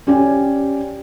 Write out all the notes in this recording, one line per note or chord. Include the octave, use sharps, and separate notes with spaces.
C#4 G4 D5 G5 G#5